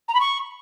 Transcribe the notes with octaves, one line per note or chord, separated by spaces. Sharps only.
A#5
B5
C#6